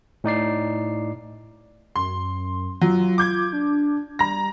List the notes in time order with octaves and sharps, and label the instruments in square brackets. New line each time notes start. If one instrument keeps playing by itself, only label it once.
[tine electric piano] A2 D#4 D5 C7
[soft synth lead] F#2 [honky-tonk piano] C6
[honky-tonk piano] F#3 [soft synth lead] F4
[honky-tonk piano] D6 G6 G#6
[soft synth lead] D4
[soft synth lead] G3 [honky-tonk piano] A#5 A#6